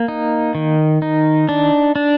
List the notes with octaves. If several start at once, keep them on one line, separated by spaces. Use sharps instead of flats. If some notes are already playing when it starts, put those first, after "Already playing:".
Already playing: A#3
D#4
D#3
D#4
D4
D4